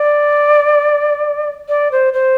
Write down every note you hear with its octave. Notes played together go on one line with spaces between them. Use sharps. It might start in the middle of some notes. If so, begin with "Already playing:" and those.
Already playing: D5
D5
C5
C5